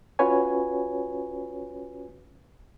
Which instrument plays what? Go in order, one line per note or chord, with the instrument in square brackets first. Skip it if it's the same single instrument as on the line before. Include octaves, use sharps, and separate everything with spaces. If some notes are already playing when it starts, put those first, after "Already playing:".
[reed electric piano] C#4 F4 F#4 B4 C#5 G#5